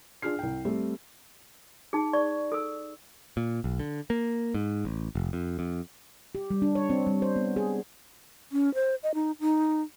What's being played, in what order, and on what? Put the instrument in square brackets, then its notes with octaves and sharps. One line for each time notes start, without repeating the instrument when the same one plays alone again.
[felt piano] D4 F4 G#4 F6 C7
C2 G5
G3 A3 C4
[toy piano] D#4 G#4
D5 C#6
A4 E6
[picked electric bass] A#2
B1
D3
A#3
G#2
A1
F1
F2
F2
[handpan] G4
G3
D4
C#5
C4
G3
C5
B3
G#4
[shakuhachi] C#4
C5
D#5
D#4
D#4